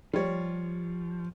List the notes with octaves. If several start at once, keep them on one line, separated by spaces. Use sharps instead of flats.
F3 G3 C#5